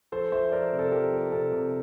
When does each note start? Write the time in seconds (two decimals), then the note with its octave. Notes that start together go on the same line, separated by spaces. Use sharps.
0.12 F3 A4 C5
0.32 F3 C5 E5
0.52 F3 A#4 D5
0.72 C3
0.79 A4
0.92 F3 G4 A#4
1.12 F3
1.32 C3 A4
1.52 C3